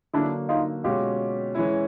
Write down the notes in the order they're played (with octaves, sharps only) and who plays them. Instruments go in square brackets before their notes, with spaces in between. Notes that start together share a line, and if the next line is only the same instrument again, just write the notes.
[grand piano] D3 F#3 A#3 [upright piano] D4 E4
[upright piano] D#4 F4
[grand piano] B2 G#3 C#4 [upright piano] F4 G4
[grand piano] E3 G#3 C#4 E4